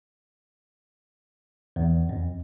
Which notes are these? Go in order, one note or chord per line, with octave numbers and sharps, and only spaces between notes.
E2
F2